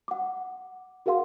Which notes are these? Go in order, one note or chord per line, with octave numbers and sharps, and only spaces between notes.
F#5 D6
F#4 G#4 A#4 F5 F#5 C6